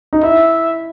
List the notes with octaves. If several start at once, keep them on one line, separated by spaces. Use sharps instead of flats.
D#4
E4 E5